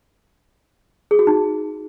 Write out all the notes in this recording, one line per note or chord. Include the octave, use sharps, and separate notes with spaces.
G#4
F#4
D#4